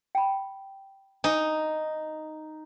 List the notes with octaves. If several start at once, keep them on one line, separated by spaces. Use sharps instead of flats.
G5 B5
D#4 G#5 D6